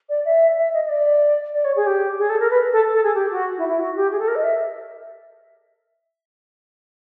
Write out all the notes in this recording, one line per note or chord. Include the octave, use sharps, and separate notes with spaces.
D5
E5
E5
D#5
D#5
D5
D5
C#5
G#4
G4
G#4
A4
A#4
B4
A4
A4
G#4
G4
F#4
E4
E4
F#4
G4
G#4
A4
A#4
D#5
E5